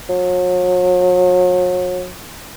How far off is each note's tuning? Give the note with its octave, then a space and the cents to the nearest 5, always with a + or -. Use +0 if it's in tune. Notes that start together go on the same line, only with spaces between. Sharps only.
F#3 -40